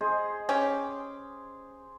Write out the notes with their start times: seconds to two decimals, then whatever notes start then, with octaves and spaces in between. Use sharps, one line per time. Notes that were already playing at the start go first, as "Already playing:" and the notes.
0.01 G#4 C5 D#5
0.49 C#4 G4